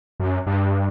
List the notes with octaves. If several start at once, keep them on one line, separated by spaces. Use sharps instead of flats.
F#2
G2